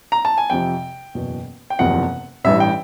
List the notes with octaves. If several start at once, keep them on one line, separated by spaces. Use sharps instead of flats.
A#5
A5
G#5
F2 C3 F3 G5
F#1 E2 B2
G5
F#1 E2 C3 F3 F#5
A1 G2 E3 E5
G5